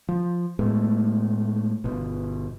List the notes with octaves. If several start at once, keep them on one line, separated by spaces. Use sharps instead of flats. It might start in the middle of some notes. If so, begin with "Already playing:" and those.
F3
A2 G#3 A3 B3
G1 B2